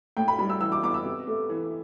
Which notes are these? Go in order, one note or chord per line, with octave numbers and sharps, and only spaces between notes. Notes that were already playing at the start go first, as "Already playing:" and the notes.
A2 G5
B5
G3 B5
E6
E3 E6
D6
B3 D6
E6
C3
A3
E3